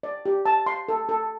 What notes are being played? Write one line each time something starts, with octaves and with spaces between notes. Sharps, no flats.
D5
G4
A5
C6
A4
A4